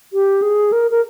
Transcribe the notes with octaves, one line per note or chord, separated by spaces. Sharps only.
G4
G#4
A#4
A#4